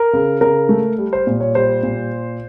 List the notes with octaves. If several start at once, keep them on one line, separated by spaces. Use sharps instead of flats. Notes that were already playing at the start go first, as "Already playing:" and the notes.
Already playing: A#4
C#3
C#3 A#4
A3
G3
C5
A#2
C#5
G3 C5
A#2